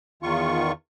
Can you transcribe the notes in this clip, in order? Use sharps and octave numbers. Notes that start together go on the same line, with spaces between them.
E2 D#3 F4 C#6